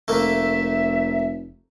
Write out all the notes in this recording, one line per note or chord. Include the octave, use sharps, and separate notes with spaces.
F1 A3 A#3 E5